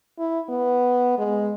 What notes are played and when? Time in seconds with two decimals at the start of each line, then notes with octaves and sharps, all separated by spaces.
0.19 E4
0.49 B3
1.18 G#3